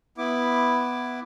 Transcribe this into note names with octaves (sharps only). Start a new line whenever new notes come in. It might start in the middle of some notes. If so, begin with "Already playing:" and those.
B3 E4 D6